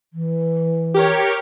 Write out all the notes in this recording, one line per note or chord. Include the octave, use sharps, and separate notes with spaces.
E3
G4 A#4 C#5